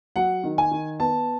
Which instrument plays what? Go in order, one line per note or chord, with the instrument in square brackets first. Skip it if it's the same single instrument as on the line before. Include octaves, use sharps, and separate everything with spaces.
[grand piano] F#3 F#5
D#3
G#5
D#3
B3 A5